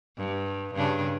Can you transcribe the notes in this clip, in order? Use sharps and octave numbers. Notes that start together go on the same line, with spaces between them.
G2
G2 C#3 D4